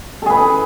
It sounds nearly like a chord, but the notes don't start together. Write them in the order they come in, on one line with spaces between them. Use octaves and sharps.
A4 G#4 B4